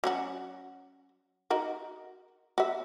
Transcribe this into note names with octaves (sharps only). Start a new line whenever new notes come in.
F#3 C#4 F#4
D#4 F#4 A#4
F#4 E5